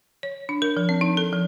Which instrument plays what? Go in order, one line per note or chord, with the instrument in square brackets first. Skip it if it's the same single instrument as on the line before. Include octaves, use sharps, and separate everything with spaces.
[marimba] C#5
D4
A#4
F3
C4
D#4
A4
F3